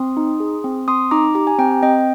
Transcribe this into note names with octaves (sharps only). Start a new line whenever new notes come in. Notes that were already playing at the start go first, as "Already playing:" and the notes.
Already playing: C4 C6 D#6
D#4
G#4
C4
C4 C6 D#6
D#4 A#5 D6
G4 A#5
G#5
C4 G5 A#5
C4 D#5 G5